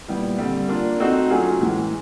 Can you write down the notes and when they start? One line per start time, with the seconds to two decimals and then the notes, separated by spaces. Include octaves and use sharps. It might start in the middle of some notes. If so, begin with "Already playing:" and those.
0.08 A#2 G3 B3 E4
0.38 D3 G3 C4
0.69 A#3 D4 F4
1.00 A3 C4 D#4 F#4
1.30 F#3 A3 C#4 F4 G#4
1.60 A2 E3 G#3